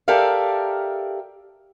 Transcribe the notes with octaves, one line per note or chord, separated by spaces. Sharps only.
G4 A4 A#4 D5 E5 F5